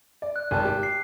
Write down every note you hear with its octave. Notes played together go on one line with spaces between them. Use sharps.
D5
F#6
G#1 G5 A5
G4
C7